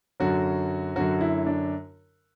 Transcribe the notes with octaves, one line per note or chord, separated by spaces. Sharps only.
F#2 D3 F#3 F#4
F#2 D3 F#3 F#4
E4
D4